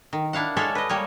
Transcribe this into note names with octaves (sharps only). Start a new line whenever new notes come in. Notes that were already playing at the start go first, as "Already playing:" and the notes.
D#3
D4 E4 F5 F#5
G#3 A4 C#5 D5 E5 F5
B4 D#5
G3 A#3 C#5